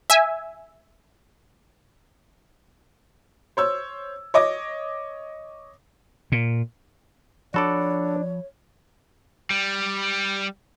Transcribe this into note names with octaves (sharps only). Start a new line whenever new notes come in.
E5 G#5
C5 C#5 E6
C#5 D#5 D6 A#6
A#2
F3 D4 F#4 A4 C#5 D5 B5
G3